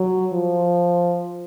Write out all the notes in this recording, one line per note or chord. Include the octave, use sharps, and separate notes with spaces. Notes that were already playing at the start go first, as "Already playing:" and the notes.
Already playing: F#3
F3